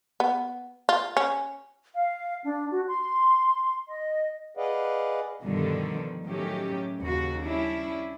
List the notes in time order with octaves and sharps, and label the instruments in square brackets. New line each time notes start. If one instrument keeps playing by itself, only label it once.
[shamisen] B3
F4
C#4
[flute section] F5
D4
F#4
C6
D#5
[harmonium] G#4 B4 D5 D#5 F5 F#5
[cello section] G2 B2 D3 D#3 F3 G3
A2 D#3 F#3 A3 C#4 G4
D#2 C#3 F#4
G3 C#4 D4 E4